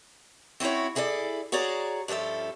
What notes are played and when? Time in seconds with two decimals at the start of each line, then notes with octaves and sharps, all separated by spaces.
0.60 C4 C#4 E4 F#4 C#5
0.95 E4 G#4 A4 C5 D5
1.52 F#4 G#4 C#5 D5 A#5
2.08 G2 F3 C#4 A4 E5